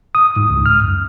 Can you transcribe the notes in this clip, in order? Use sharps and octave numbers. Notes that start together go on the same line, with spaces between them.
D#6
G#2
C#2
F6
F#2